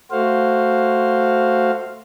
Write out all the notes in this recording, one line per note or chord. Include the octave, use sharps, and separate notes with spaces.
A3 F#4 C5 F5